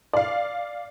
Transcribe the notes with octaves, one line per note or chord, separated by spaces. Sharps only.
D5 F5